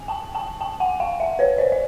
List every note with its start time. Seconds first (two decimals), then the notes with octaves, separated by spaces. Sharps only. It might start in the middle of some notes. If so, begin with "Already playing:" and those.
Already playing: G#5
0.08 G5 A5
0.35 G5 A5
0.61 G5 A5
0.80 F#5 G#5
1.00 F5 G5
1.20 E5 F#5
1.39 B4 C#5
1.58 C5 D5
1.72 D5